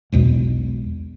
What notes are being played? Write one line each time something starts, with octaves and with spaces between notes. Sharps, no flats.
B1 E2 B2 G#3